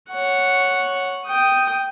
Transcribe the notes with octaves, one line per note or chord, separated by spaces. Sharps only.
C#5 F#5
G5 D#6